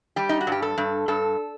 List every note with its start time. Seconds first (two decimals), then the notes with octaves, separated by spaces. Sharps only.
0.16 G3 G4
0.29 D#4
0.41 F#4
0.47 G2 G4
0.62 A4
0.78 G2
1.08 G2 A4